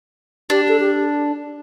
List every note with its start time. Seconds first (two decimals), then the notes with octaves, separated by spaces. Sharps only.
0.50 D4 G4
0.69 A4
0.80 G4